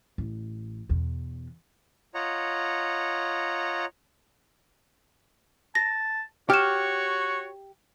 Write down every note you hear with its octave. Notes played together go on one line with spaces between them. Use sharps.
A1
E2 B2
F4 C#5 D#5 F#5 A#5
A5 A#6
F#4 G4 C#5 F6 E7